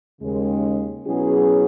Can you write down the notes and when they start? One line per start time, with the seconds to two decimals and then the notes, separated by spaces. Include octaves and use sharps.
0.21 D#2 C#3 G#3
1.07 B2 F#3 C#4 E4 G#4